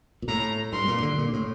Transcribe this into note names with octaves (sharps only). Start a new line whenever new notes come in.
A#2
A2 A#5
G2 C6
A#2
D3
A#2
A2